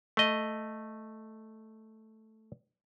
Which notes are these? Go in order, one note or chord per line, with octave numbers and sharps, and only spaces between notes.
A3 D#5